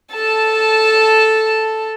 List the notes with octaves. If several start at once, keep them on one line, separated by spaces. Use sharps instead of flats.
A4 A5